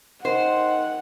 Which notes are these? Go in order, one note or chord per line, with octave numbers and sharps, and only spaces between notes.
D#3 C5 F#5